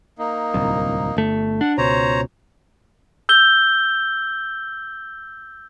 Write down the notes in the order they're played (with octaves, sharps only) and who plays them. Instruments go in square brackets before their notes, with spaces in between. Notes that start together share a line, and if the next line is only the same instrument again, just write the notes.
[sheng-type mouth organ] A#3 D#4
[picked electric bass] D1 C2
G1 A3
[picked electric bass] D4 [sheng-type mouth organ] F#5
[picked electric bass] C#2 B2 [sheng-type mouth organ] C5 C#5 A#5
[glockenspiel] E6 G6 G7